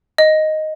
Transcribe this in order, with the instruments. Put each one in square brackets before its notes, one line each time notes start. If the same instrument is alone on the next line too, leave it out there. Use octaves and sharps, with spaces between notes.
[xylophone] D#5